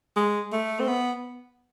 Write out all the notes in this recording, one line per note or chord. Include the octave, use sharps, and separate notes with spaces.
G#3
A3
C4
B3